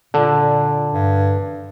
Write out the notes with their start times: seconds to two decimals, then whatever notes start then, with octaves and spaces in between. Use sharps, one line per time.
0.14 A#2 D3
0.93 G2